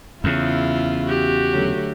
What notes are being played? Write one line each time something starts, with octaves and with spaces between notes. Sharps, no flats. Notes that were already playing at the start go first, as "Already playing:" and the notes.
E2 C#3 E4 F4
F#4 G4
D3 F#3 A3